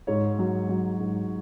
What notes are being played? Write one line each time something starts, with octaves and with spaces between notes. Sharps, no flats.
G#2 C#5
F#3
F#3
G#2